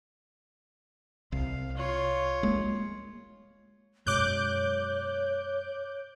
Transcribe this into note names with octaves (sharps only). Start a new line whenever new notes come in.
C2 F5
F4 C#5
G#3 A#3
F#2 B2 G#3 C#5 D6 F#6 G6